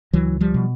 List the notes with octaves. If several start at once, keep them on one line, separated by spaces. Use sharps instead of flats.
C#2 E3 F#3
F3 G3
B2